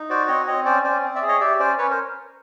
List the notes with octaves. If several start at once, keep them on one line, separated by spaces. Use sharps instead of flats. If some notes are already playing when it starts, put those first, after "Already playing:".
Already playing: D#4
F#4 C5 D5
C4 C#5 D#5
C4 C#5 D#5
C#4 C5 D5
C#4 C5 D5
C4
D5 E5
G#4
C#5 D#5
G4 D5 E5
C#4 C5 D5
C#4 B4 C#5
A#4 C5